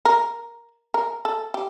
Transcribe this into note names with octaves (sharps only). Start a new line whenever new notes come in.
A#4
A#4
A4
G4